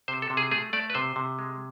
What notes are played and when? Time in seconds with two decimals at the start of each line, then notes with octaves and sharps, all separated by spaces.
0.08 C3 C5
0.22 A4
0.30 C3
0.37 G#4
0.51 A3 G#4
0.73 A3 D5
0.90 B4
0.95 C3 C5
1.16 C3
1.39 G#3